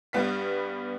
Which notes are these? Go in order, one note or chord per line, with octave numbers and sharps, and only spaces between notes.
G2 G3 B3 F5 B6